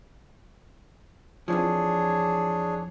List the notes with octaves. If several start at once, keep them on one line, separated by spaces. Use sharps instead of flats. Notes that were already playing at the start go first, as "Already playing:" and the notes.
F2 E3 F3 D4 G#4 C#5